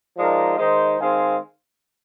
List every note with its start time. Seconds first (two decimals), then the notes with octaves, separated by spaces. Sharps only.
0.16 F3 G#3 D#4 A#4 D5
0.57 D#3 G#3 D#4 C5 D#5
0.98 D#3 G#3 C4 F5 G#5